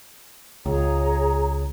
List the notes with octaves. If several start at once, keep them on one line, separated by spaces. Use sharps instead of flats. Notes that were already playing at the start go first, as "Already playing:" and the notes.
C#2 G#4 C#5 A#5